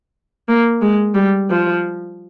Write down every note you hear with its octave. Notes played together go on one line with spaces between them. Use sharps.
A#3
G#3
G3
F3